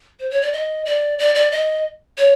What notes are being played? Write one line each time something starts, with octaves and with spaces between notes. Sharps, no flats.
C5
C#5
D5
D#5
D5
D5
D5
D#5
C#5